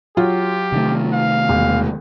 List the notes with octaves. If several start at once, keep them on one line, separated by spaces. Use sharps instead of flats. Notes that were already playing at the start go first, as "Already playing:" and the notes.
F#3 F4 G4
C3 D#3 A3
F5
E1